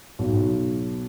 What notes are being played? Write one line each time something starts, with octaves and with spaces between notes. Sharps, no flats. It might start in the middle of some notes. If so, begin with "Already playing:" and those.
B1